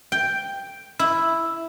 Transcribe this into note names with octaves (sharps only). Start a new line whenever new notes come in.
G5
E4